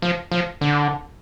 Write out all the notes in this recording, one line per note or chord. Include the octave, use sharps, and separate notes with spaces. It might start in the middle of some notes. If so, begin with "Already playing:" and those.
F3
F3
D3